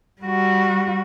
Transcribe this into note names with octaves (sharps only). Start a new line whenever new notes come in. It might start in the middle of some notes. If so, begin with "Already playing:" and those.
G3 F#4